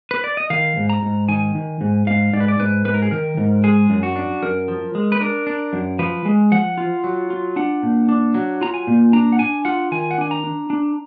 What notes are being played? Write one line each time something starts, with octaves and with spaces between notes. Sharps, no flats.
B4
D5
D#5
D#3 F5
G#2
A#5
G#2
D#3 G#5
D#3
G#2
G#2 F5
G#2 D5
B4
D5
G#2 B4
G#2 B4
A#4
G#4
D#3 A#4
G#2
G#3 G#4
F#2
F#4
D4
F#2 A#4
F3
G#3
B4
D4 A#4
D4
F#2
F3 B4
G#3
F3 F#5
F4
F#3
F4
D4 F#5
A#2
D4
F#3
F4 A#5
G#5
A#2
D4 A#5
F#5
D4 G#5
F4 F#5
D#3 G#5
F#5
D4 G#5
A#5
D4
D4